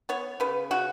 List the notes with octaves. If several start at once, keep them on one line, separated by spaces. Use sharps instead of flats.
B3 C#5
C#3 B4
C#3 F#4